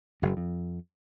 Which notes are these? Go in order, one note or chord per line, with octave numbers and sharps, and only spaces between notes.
F#1 F#2
F2